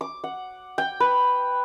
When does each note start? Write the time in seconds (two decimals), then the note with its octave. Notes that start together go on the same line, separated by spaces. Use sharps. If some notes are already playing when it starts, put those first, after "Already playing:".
0.01 D6
0.24 F#5
0.78 G5
1.00 B4